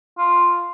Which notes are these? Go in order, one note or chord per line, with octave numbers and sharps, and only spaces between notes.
F4